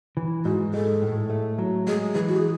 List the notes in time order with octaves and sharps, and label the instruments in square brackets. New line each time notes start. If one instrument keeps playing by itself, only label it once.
[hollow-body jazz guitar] E3
[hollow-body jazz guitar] G#2 [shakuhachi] F#4
[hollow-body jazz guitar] G#3 [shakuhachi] A4
[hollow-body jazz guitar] A2
A3
F#3
[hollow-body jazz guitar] G#3 [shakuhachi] G#4
[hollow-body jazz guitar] E3 [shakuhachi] G#4
[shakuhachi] F#4
G#4